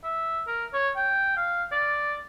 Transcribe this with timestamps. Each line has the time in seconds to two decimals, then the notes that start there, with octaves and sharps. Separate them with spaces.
0.04 E5
0.47 A#4
0.74 C#5
0.96 G5
1.37 F5
1.71 D5